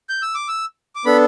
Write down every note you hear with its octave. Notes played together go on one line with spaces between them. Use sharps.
G6
E6
D6
E6
D6
B3 D4 A4 B5